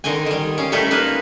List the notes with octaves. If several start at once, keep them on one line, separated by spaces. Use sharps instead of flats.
D3 D#3 C4 D#5 G#5
D#3 G3
C#4 F5
G3 A3 C#4 D#4 E4 A4
A#3 D#4 F4 B4